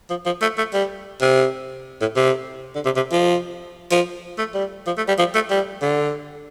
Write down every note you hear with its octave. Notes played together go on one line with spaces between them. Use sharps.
F3
F3
A3
A3
G3
C3
A2
C3
D3
C3
C3
F3
F3
A3
G3
F3
A3
G3
F3
A3
G3
D3